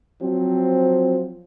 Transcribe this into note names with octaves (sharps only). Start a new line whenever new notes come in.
F3 F#3 C4